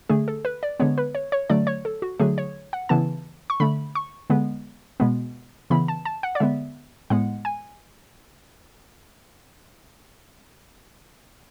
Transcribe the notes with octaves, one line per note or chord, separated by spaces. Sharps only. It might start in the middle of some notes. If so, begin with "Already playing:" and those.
D3 A3 G#4
A4
B4
D5
D3 G#3 B3 C#5
B4
C#5
C#5
D3 F#3 A3 D5
C#5
A4
F#4
D3 F#3 A3 G#4
C#5
F#5
C#3 E3 B3 A5
C#6
D3 A3 B5
C#6
D3 G#3 B3
B2 G#3 B3
C#3 E3 B3 B5
A5
A5
F#5
D5
D3 G#3 B3 E5
A2 G#3 B3 F#5
G#5